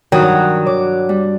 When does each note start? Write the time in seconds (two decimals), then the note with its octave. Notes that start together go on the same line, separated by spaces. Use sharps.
0.12 G2 D#3 F#3 F#4 A#4 G5 D#6
0.67 C#5 D6
1.09 G3